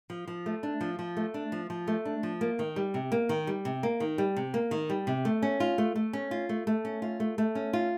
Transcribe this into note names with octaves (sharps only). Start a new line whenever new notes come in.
F3
F3
A3
D4
F3
F3
A3
D4
F3
F3
A3
D4
F3
A#3
D#3
G3
C3
A#3
D#3
G3
C3
A#3
D#3
G3
C3
A#3
D#3
G3
C3
A3
C#4
F4
A3
A3
C#4
F4
A3
A3
C#4
F4
A3
A3
C#4
F4